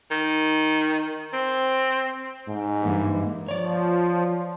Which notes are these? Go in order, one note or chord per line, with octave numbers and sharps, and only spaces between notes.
D#3
C4
G#2
G2 E3 A#3
F3 C#5 D5